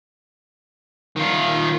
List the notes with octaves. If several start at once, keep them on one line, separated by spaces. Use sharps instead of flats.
D#3 F4